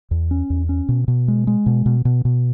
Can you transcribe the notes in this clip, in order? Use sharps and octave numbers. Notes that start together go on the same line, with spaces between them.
E2
C#4
E2
C#4
B2
B2
G#3
G#3
B2
B2
B2
B2